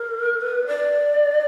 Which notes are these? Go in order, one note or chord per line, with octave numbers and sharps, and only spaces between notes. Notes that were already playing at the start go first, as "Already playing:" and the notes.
Already playing: A#4
B4
D5